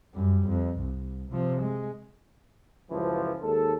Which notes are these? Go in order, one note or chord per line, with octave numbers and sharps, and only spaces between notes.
F#2 G3
F2
C2
C3 F3
G#3
C#2 F#2 E3 F3
D#2 G#3 A4